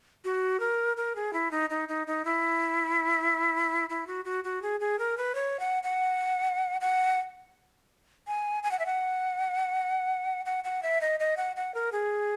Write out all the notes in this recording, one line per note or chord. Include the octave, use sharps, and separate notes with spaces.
F#4
A#4
A#4
G#4
E4
D#4
D#4
D#4
D#4
E4
E4
F#4
F#4
F#4
G#4
G#4
A#4
B4
C#5
F#5
F#5
F#5
G#5
G#5
F#5
E5
F#5
F#5
F#5
E5
D#5
D#5
F#5
F#5
A#4
G#4